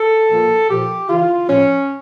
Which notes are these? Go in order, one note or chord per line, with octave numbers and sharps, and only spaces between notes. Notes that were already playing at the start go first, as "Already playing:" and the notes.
Already playing: A4
A#2 F3
A#2 F3 G4
C#3 E3 F4
A2 F3 C#4